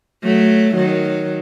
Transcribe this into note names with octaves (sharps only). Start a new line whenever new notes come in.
F#3 A3
D#3 F#3